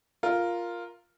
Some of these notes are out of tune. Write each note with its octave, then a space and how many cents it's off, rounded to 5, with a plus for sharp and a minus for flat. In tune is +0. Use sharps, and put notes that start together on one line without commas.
F4 +0 A#4 +0